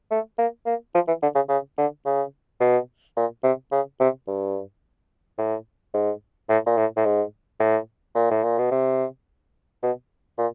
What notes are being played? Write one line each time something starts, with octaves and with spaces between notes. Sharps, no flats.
A3
A#3
A#3
F3
E3
D3
C#3
C#3
D3
C#3
B2
A#2
C3
C#3
C3
G2
A2
G#2
A2
A#2
A2
A2
G#2
A2
A#2
A2
A#2
B2
C3
B2
A#2